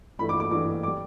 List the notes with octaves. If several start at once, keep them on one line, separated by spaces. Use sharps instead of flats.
G2 E3 A3 B5
D6
D6
G2 E3 A3 D6
D6
G3